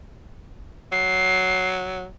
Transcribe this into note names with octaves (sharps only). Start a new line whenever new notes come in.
F#3 C7